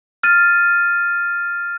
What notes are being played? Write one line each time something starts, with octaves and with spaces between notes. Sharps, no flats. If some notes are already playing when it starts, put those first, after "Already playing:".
F6 A6 D#7